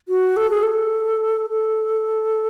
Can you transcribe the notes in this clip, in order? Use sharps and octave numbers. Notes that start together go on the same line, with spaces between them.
F#4
A4
G#4
A4
A4